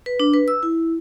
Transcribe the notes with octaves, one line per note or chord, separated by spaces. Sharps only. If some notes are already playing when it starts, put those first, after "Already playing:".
B4
D4
B4
E6
E4